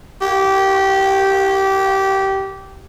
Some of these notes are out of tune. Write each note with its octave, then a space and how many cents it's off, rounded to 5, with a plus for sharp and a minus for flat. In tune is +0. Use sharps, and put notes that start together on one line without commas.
G4 -20